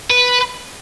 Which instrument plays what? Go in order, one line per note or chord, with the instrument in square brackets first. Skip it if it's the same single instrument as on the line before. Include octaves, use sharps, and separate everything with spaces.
[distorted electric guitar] B4